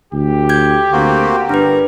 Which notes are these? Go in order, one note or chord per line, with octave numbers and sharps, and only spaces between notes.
D2 G4
G6 G#6
D2 A#3 C4 F#4
G1 D4 A#4 B4